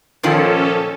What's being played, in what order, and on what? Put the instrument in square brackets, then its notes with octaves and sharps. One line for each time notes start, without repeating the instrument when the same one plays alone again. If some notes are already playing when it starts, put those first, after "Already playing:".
[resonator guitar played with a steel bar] A#2 D#3 F3 [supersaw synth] C#4 A4